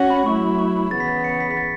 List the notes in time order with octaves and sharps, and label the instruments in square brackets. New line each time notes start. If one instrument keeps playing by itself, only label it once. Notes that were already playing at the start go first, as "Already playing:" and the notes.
Already playing: [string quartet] C#4 F#4
[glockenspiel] B5
[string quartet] F#3 A3 E4 [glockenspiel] C#6
[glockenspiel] C#6
[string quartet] C#3 E3 B3 [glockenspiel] A6
[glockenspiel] B6
A6
C#7
B6
B6
A6